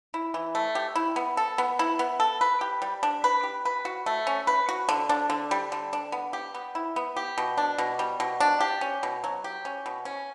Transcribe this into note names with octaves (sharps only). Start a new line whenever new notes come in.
E4
E3
A3
G4
E4
B3
A4
B3
E4
B3
A4
B4
G4
G3
D4
B4
G4
B4
F#4
A3
C#4
B4
F#4
D3
D4
D3
G3
D3
D4
B3
G4
B3
E4
B3
G4
B2
D4
B2
G3
B2
D4
G4
C#4
B2
F#3
G4
C#4
B2
C#4